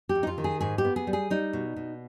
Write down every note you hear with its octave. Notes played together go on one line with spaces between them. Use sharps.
G4
F2
D#4
F4
D#3
G#4
G#2 G#4
G4
B3
G#4
G3
G#4
G3 D#4
B2
B2